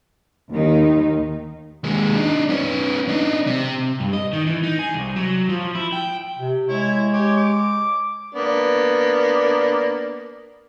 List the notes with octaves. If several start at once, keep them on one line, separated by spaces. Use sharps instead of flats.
D#2 D#3 D#4
D#2 G#3
D4 D#4
B3 C#4
D4 D#4
C3
G2
D#5
D#3
E3
D#4
G#4
C2
F#3
F3
E4
G5
C3
G#3 E4 C#5
G4 C#5
D6
A#3 B3 D4